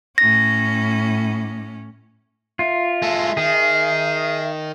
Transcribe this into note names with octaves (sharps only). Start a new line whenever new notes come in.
A2 C#4 A#6
F4 E5
G#3 A4
D#3 G#4